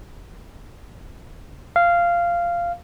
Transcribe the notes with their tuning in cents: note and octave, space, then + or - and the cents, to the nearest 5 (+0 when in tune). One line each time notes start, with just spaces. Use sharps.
F5 -15